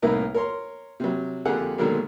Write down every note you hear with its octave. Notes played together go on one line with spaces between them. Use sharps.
C2 A2 A#3 D#4 A#4 B4
A#4 C#5 C6
C3 F#3
F2 D3 A#3 G4 G#4 F#5
B2 D3 D#3 F#3 G#3 A#3